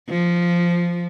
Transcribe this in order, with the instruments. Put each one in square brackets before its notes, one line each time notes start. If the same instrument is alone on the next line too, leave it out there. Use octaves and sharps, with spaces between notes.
[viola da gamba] F3